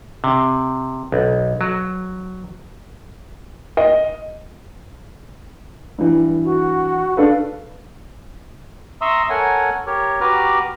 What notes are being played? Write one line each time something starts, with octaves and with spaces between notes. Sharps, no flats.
C3
B1
F#3
D#5
G2 E3
F#4
D4 A4 B4 F5
E5 A#5 C6 C#6 D#6 E6
A4 A#4 C#5 F#5 G#5
G4 A#4 C#5
F#4 G4 B4 A#5 D6 F6